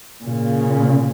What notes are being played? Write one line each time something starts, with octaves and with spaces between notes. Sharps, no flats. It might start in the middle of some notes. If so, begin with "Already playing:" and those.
A#2 C#3